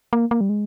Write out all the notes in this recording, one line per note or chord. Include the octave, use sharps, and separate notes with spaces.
A#3
A#3
G3
G#3